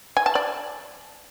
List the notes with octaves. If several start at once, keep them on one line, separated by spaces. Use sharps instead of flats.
G#5
A5
D5